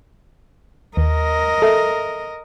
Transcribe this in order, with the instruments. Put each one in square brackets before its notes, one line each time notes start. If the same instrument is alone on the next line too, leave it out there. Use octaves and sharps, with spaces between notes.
[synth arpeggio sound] D#2 [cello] A#4 D#5
[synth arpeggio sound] A4 E5